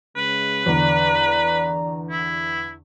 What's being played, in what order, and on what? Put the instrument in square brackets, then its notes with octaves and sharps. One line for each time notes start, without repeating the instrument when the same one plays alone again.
[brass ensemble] C#3 G#3 [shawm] B4
[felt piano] E2 D3 [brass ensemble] D5 A#5
[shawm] E4